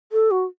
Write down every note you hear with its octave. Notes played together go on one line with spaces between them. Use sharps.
A4
F#4